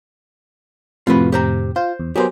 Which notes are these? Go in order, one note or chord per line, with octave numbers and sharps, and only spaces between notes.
F2 A2 C3 F4 F#4 B4
G4 C5 A#5
F4 C5
E2
F#3 B3 G4 G#4 A#4 C5